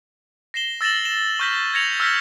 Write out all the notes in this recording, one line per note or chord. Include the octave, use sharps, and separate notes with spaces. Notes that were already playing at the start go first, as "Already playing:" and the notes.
A#6 C7 E7 G7
E6 A6 A#6 E7 F#7
A#6 E7 G7
C#6 F6 G6 A#6 B6
G#6 A#6 C#7 F7 F#7
E6 F6 G6 A#6 B6